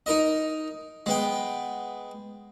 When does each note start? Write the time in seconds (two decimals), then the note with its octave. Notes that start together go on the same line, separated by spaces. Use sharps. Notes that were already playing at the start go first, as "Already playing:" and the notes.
0.06 D#4 A#4 D#5
1.06 G#3 B3 G5